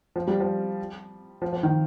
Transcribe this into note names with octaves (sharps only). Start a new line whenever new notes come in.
F3
G3
F3
F3
F3
D#3